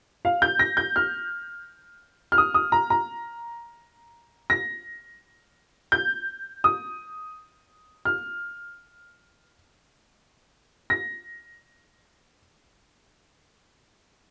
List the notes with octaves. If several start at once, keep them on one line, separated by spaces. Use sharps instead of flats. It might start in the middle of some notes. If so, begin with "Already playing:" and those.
F5
G6
A#6
G6
F6
F6
D#6
D#6
A#5
A#5
A#6
G6
D#6
F6
A#6